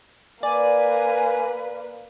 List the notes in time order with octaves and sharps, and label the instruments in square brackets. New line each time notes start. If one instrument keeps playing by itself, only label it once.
[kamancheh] A#3 B4 [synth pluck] D5 [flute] G#5